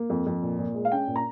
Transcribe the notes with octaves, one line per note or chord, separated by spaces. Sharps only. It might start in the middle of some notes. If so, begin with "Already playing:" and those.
Already playing: A#3
F2
F2
A#2
A#2
G#3
F5
C#4 G5
A#2
A#5